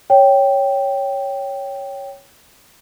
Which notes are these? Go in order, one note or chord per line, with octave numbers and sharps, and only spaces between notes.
C#5 G5